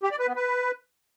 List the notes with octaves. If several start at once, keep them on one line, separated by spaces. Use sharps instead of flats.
G4
D5
B4
B3
B4